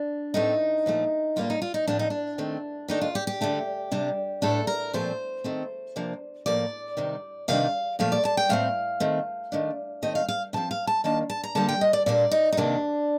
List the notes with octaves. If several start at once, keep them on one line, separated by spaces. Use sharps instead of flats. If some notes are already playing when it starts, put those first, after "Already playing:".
Already playing: D4
A2 A3 C4 D#4
A#2 F3 A3
A2 G3 A#3 D4 F4
D#4
F4
D#4
A2 F3 C4 D4
D#4
D4
D#3 A3 C4
D#3 A3 D4 D#4
F4
G4
G4
D3 A3 D4
C3 G3 D4
A2 A3 D4 A4
A#4
A#2 F3 A3 C4 C5
D#3 A3 C4
C3 F3 A#3 D4
A2 F3 A#3 D5
C3 D#3 G3
C3 D#3 G3 D4 F5
A#2 F3 A3 F5
D5
A5
G5
A2 A3 C4 F5
D#3 A3 C4
D#3 A3 D4
D#3 A3 C4 D#5
F5
F5
C3 F3 C4 A5
F5
A5
D#3 A#3 D4 A5
A5
A#5
D3 G3 A#3 A5
G5
D#5
D5
A#2 G3 A#3 D4 D5
D#4
D#4
C3 D#3 A#3 D4